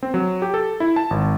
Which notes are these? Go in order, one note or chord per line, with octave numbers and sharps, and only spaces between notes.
C4
F#3
G4
A4
E4
A5
G#1